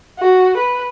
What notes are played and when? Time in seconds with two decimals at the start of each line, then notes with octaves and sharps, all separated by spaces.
0.19 F#4
0.57 B4